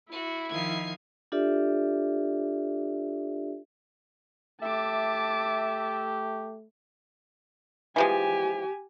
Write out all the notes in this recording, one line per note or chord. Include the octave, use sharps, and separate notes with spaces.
E4 F#4
D#3 F3 D#4 G#6 C7
D4 F4 G4 A4 D5 E5
A3 G4 E5 A5 D6
E3 F3 G#3 G4 G#5